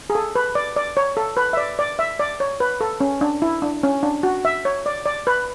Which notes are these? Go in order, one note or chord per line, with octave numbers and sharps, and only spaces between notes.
G#4
A4
B4
D5
D5
C#5
A4
B4
E5
D5
D5
E5
D5
C#5
B4
A4
C#4
D4
E4
D4
C#4
D4
F#4
E5
C#5
D5
D5
B4